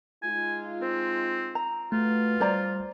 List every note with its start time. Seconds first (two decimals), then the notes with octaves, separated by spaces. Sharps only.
0.23 G#3 D#4 F4 G#5
0.82 C4 C5
1.55 A#5
1.92 B2 A3 F4 F#4 B4
2.40 G3 C5 D5 A#5